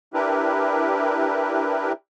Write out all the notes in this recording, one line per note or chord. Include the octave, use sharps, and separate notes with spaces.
D4 E4 G4 A#4 B4